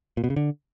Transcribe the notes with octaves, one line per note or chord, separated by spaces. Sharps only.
A#2
B2
C#3
D3